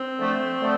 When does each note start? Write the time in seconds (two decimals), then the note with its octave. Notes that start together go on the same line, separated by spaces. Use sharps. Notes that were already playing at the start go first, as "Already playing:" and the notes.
Already playing: C4
0.18 D3 F3 A3
0.60 D3 F3 A3